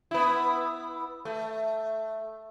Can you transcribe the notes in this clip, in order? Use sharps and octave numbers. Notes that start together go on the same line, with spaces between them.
B3 E4
A3